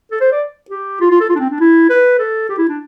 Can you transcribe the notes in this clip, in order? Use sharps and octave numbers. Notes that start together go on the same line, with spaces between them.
A4
C5
D5
G4
F4
F4
A4
F4
D4
C4
D4
E4
B4
A4
G4
E4
D4